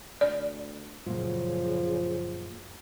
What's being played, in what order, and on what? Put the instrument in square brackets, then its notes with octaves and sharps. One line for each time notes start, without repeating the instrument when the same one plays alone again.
[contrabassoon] D2 [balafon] D5
[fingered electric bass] F#2 A#2 F#3 [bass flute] C#3 [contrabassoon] F3